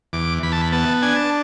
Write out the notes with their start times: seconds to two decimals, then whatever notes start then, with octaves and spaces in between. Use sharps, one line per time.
0.13 E2 D6
0.43 E2 B5
0.52 A5
0.61 B5
0.72 B3 A5
1.02 D4 G#5
1.16 A5